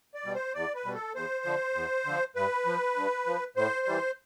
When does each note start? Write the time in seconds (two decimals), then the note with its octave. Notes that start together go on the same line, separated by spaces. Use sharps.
0.14 D5
0.24 B2 G3
0.35 C5
0.54 E2 D5
0.75 B4
0.85 B2 G3
0.95 A4
1.15 E2 C5
1.45 D3 F3
1.75 E2
2.06 D3 F3
2.36 G2 B4
2.66 F3
2.96 G2
3.26 F3
3.56 A2 C5
3.86 E3 G3